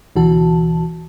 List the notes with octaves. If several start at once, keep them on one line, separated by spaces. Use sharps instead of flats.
D2 B2 E3 F#4 A5